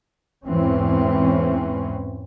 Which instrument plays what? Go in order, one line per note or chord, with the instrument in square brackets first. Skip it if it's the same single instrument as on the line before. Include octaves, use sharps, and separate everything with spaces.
[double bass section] E2 G#2 E3 C4 C#4